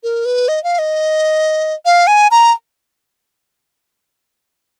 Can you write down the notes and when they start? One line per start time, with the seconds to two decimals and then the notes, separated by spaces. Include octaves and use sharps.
0.03 A#4
0.25 B4
0.48 D#5
0.64 F5
0.78 D#5
1.85 F5
2.07 G#5
2.31 A#5